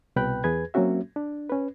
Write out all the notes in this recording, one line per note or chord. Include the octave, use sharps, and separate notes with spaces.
C2 B2 B4 G5 B5 F#6
E2 G#4 B4 G#6
F#3 A#3 C4 C#4 F#4 E5
D4
C#4 B4